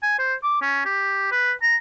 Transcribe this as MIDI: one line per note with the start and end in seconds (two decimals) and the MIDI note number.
0.03 0.17 80
0.19 0.34 72
0.43 0.58 86
0.62 0.83 61
0.85 1.28 67
1.31 1.52 71
1.62 1.76 82